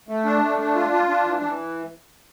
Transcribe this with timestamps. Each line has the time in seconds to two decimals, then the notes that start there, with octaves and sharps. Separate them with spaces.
0.08 A3
0.25 D4
0.41 A3
0.59 D4
0.75 F4
0.92 F4
1.08 D4
1.24 E3
1.42 E3